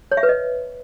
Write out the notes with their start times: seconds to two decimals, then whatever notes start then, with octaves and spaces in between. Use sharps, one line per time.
0.11 C#5
0.17 E5
0.23 B4
0.29 D#5